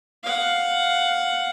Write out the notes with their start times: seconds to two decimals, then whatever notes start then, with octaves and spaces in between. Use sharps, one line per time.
0.23 F5 F#5